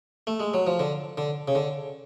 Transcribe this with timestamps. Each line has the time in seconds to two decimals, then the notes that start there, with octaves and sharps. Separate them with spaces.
0.27 A3
0.40 G#3
0.54 F#3
0.67 F3
0.80 D3
1.18 D3
1.48 C#3
1.55 D3